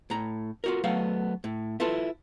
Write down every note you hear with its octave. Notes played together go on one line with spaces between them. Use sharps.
A2 A#5
F4 F#4 A#4
F#3 A3 B3 F5
A2
E4 F4 A4 B4 A5